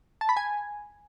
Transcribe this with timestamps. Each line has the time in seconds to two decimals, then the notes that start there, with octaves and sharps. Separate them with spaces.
0.21 A5
0.29 B5
0.37 G#5